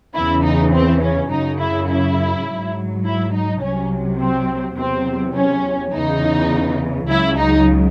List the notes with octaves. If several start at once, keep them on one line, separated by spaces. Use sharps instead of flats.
E2 C#3 E3 E4
D#4
C4
C#4
F#2 C#3 F#3 D#4
E4
E4
G#2 F#3
E4
D#4
C2 C3 F#3 C#4
C4
E2 C3 F#3 C4
C#4
E2 C#3 E3 D#4
C#2 C#3 F#3 E4
D#4